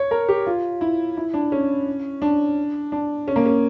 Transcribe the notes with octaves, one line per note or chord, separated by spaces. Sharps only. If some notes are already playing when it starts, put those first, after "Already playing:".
Already playing: C#5
A#4
G4
F4
E4
E4
D4
C#4
D4
D4
C#4
A#3
C#4